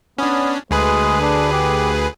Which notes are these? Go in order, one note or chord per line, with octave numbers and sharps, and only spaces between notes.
B3 C#4 D4
D2 G#3 G#4 B4
D4
G4